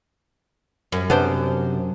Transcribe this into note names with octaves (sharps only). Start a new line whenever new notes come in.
F#2
C3 B3 D4 C5